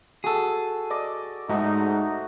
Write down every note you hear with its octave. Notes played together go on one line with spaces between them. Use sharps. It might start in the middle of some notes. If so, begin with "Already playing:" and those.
F#4 G#4 A4
D5 D#5 D6
G#2 A3 D#4 F#4